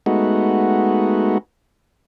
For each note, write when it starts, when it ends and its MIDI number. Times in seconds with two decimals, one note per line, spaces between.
0.06 1.38 56
0.06 1.38 57
0.06 1.38 59
0.06 1.38 63
0.06 1.38 66